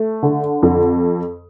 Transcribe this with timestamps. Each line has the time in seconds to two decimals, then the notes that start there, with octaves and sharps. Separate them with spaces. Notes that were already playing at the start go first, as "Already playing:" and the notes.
Already playing: A3
0.23 D3
0.63 F2